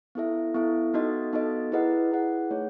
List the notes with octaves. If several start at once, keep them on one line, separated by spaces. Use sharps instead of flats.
B3 E4 A4 E5
B3 E4 A4 E5
B3 D#4 F#4 A4 D#5
B3 D#4 F#4 A4 D#5
E4 G#4 B4 D#5 F#5
E4 G#4 B4 D#5 F#5
A3 D#4 G#4 C#5 F#5